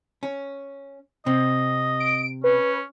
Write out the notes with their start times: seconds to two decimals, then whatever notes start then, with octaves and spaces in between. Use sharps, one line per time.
0.23 C#4
1.26 C3 C4 D#5
2.00 D7
2.44 C#4 B4